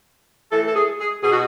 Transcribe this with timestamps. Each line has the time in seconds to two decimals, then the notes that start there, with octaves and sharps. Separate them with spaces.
0.52 A2 E3 A4
0.67 A4
0.75 G#4
0.99 G#4
1.24 B2 G#4
1.32 F#4